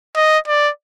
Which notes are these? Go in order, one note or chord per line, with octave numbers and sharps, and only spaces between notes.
D#5
D5